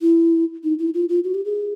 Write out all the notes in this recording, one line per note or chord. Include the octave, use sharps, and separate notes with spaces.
E4
D#4
E4
F4
F4
F#4
G4
G#4